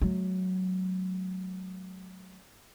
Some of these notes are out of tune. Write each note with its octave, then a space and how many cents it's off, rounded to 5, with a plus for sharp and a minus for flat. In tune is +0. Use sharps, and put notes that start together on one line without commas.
F#3 +0 A3 -35